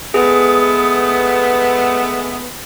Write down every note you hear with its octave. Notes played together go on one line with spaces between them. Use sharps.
G#3 A3 B3 G#4